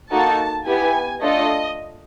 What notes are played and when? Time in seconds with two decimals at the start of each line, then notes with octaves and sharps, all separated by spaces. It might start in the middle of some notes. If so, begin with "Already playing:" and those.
0.10 A#3 D#4 F#4 A4 A5
0.65 B3 E4 G4 G#5
1.21 A3 D4 F4 A4 D#5